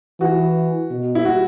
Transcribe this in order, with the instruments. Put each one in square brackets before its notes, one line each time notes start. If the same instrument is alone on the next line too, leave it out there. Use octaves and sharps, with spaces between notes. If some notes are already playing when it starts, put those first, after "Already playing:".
[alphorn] E3 [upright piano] F#4
[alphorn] B2
[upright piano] E4
F#4